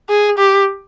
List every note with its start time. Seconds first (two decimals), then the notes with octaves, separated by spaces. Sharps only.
0.10 G#4
0.38 G4